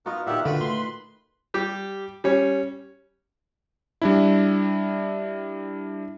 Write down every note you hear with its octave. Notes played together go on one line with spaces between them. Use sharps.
B3 D#4 F4 F#4 A#4
A#2 D#3 G4 E5 F#5
D3 F4 F#4 B4 B5
A3 C6
G3 G4
G3 C#4
G3 D4 E4